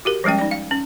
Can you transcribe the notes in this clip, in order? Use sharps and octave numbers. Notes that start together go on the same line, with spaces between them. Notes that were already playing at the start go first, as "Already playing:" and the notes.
F#4 G4 A#4
F3 G3 G#3 C#4 G5
D#4 D5
F5
C#4